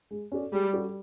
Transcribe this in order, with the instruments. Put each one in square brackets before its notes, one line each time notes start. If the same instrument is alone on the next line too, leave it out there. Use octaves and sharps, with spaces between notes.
[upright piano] G#3
C#4 F#4 A4 D5
[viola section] G3 [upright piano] G#3
[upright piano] C#4 F#4 A4 D5